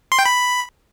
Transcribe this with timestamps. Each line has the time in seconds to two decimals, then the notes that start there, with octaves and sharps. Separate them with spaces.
0.12 C6
0.19 G5
0.26 B5